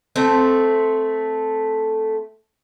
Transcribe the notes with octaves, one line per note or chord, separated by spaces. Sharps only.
A3 C4 E5